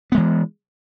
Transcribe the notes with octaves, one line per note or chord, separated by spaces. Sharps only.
E3 G#3 B3